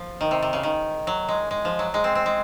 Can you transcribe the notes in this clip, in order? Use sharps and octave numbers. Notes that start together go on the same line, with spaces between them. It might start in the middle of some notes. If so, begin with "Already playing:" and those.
Already playing: F3
D#3
C3
C3
C#3
D#3
F#3
G#3
G#3
F3
F#3
G#3
C4
C4
G#3